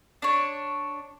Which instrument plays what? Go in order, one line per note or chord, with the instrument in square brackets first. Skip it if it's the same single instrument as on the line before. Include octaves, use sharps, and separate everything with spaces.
[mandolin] D4 C#5